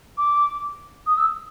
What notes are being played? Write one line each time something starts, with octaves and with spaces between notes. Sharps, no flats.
D6
D#6
E6